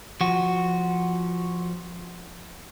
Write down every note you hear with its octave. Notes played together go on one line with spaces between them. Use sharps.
F3 F#4